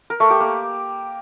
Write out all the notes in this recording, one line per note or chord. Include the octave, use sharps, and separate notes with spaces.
A#4
A3
G4
A#3